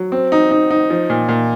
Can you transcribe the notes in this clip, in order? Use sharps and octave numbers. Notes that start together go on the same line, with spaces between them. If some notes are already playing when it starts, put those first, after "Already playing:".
Already playing: F#3
C4
D#4
D#4
D#4
F3
A#2
A#2